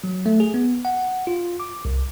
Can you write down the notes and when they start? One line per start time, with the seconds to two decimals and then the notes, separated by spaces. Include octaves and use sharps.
0.04 F#3
0.26 A3
0.40 G#4
0.54 B3
0.85 F#5
1.27 F4
1.60 D6
1.85 C2